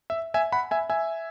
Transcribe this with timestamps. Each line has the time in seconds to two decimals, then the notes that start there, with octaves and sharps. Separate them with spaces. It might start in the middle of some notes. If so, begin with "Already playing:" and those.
0.10 E5
0.34 E5 G#5
0.52 F#5 B5
0.71 E5 G#5
0.90 E5 G#5